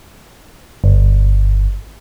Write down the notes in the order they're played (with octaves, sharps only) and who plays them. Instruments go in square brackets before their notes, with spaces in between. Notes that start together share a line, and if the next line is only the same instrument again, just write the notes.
[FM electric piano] G1